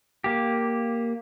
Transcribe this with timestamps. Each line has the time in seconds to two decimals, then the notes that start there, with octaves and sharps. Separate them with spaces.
0.24 A#3 G4